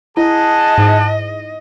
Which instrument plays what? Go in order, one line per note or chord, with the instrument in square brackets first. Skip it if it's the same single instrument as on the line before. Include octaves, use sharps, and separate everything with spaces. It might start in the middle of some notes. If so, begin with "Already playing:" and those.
[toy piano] E4 [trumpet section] G#4 F#5 A5 [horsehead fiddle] D#5
[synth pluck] G#2